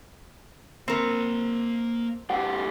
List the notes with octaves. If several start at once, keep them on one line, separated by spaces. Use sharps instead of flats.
A#3 C4 A#4 B5
B1 G4 F#5